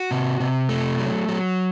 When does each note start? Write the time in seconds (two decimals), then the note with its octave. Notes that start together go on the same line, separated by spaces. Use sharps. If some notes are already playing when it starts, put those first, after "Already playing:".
Already playing: F#4
0.11 C3
0.40 C3
0.69 A3
0.99 F#3
1.28 F#3